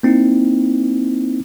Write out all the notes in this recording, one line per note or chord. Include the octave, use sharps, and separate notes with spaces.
A#3 C4 D#4 E4